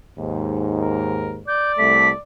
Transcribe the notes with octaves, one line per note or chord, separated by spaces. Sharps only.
D#2 G#2
A#4
D5 G6
C2 A3 B6